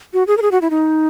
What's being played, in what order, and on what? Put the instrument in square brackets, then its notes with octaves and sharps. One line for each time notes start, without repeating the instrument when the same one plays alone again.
[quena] F#4
G#4
A#4
G#4
F#4
E4
D#4